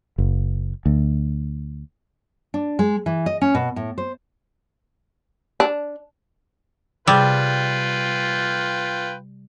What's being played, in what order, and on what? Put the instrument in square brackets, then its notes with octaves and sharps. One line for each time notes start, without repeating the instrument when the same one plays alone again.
[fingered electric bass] F#1
D2
[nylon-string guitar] D4
G#3
E3
D#5
C#4
B2
A2
C5
[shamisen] D4
[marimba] C3 G#4 [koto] G3 [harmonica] F4 B4 G5